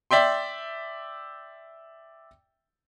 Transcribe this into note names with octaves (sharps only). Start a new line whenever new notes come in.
D5 E5 G5 C6